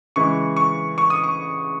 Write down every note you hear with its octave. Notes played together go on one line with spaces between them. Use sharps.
C#3 E3 G#3 C#6
C#6
C#6
D#6
C#6